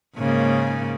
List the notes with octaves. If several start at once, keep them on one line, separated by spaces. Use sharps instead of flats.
G#2 C#3 A#3